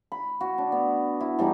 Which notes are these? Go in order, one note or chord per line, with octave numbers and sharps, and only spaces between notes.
B5
F#4
D4
B3
E4
E3 G3 A3 D#4